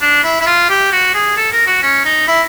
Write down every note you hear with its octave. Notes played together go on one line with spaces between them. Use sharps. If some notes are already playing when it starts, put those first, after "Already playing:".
D4
E4
E4
F4
G4
F#4
G#4
A4
A#4
F#4
C#4
D#4
E4